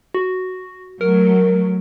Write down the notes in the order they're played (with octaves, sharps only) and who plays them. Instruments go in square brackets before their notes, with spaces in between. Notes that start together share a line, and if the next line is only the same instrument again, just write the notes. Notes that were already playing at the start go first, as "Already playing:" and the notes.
[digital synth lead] F#4
[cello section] F#3 A3 [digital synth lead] A#4